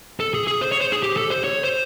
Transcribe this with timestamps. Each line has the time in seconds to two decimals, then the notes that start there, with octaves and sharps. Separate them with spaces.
0.20 A4
0.34 G#4
0.47 G#4
0.61 C5
0.72 C#5
0.81 C5
0.92 G#4
1.03 G4
1.17 A4
1.30 C5
1.44 C#5
1.64 C5